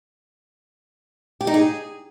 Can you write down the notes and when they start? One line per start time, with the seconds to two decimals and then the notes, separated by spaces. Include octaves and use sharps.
1.41 G4
1.47 D#4
1.54 G#4